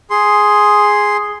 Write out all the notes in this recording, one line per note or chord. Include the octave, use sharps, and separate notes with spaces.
G#4 C6